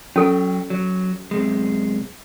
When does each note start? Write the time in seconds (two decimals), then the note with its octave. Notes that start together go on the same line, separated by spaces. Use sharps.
0.16 F#3 C#4 A4 G5
0.70 F#3
1.31 F#2 C3 G#3